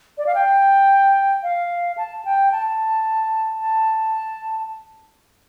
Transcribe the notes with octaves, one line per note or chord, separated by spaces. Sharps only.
D5
F5
G5
F5
A5
G5
A5
A5